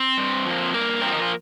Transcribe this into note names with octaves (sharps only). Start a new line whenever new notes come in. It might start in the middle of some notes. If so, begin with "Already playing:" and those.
Already playing: C4 C5
G2
F3 A#3
G2 A#3 A#4
F3 A#3 C4
D#4
F4